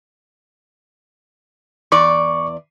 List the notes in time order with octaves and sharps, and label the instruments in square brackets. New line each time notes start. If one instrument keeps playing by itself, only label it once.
[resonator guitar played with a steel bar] E2 D5 [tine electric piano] C#6 D6